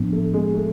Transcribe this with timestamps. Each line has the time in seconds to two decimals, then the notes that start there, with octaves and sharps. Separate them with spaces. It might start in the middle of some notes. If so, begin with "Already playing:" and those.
Already playing: A2 F3 B3 D4
0.12 A3
0.34 G#3
0.54 A3